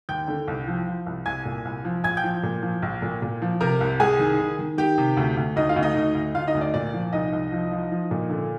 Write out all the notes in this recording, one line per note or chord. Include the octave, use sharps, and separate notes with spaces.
D#2 G5 G6
D3
C2
F3
F3
C2
C2 G#5 G#6
A#2
C2
F3
A#1 G#5 G#6
G5 G6
F3
A#2
F3
A#1
A#2
A#2
F3
C3 A#4 A#5
C2
C2 G#4 G#5
D#3
D#3
D#3
D#3 G4 G5
C3
D2
D2
D2 D#4 D#5
F4 F5
D2
D#4 D#5
D2
D2
D2 F4 F5
D#4 D#5
D2
D5
A#2 D5
F3
C2 D#4 D#5
C2
F3
F3
F3
A#2
D3